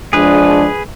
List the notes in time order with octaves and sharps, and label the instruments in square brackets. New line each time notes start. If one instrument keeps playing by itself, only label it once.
[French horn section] F3 G#3 D4 [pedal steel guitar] G#4 B4